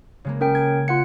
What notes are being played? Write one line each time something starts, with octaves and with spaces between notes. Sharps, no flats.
C#3 G#3 A#3
C#4 A#4 G5
G#6
F4 F#5 C#7